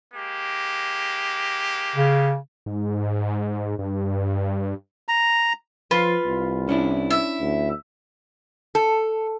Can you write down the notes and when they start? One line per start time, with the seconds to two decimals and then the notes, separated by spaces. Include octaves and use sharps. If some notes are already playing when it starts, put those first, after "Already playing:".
0.14 G#3 A#3 G4
1.96 C#3
2.66 G#2
3.79 G2
5.08 A#5
5.91 F3 F4 B4
6.25 C2
6.69 C#4 D4 E4
7.10 E5
7.41 D2
8.75 A4